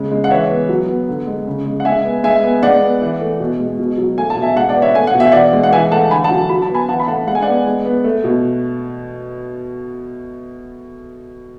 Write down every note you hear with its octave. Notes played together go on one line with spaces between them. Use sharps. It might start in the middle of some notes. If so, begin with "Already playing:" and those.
Already playing: C#3 G#3
G#3
F#5
E3 C#5 E5
B3
F#3
B3
D3
G#3
C#3
G#3
F#5
G#3 E5 G#5
B3
G#3 E5 G#5
B3
G#3 D5 F#5
B3
E3
A3
B2
G#3
B2
F#3
A3 G#5
A5
B2
E5 G#5
G#3 F#5 A5
D5 F#5
B3
C#5 E5
A3 G#5
F#5
B2
E5
E3 D5 F#5
G#3
F#5
E3 E5 G#5
A3 F#5 A5
D3 G#5 B5
F#5 A5
F#3
F#3 B5
A5
B3 G#5 B5
E3 F#5 A5
B5
A3 F#5 A5
G#3 F#5
G#5
B3 D5 F#5
G#3
B3
A3
B2